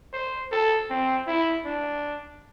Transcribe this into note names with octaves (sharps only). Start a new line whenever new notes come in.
C5
A4
C4
E4
D4